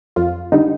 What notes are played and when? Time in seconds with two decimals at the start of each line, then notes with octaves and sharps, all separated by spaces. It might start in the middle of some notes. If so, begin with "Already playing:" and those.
0.16 F2 F4
0.52 D3 G3 D#4